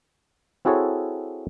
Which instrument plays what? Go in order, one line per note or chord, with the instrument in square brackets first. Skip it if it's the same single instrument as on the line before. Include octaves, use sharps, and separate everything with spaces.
[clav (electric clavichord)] C4 E4 F#4 G#4 A4 C#5